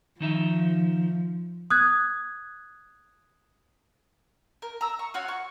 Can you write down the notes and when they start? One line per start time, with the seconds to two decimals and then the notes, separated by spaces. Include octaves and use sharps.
0.20 D#3 F3 D#4 E5
1.70 D#6 F#6 G#6
4.62 A#4
4.81 A#5 E6
4.99 C#6
5.14 F4 F#4 C#5
5.28 C#6